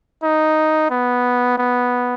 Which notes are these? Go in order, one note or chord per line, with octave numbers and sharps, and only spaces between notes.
D#4
B3
B3